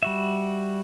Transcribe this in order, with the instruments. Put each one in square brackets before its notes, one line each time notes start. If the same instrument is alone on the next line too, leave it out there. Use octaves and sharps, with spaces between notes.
[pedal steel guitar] G3 F#4 E5